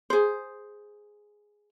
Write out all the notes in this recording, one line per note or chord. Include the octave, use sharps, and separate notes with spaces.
G#4 C5